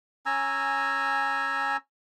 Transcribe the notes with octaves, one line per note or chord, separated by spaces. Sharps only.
C#4 G#5 A#5 E6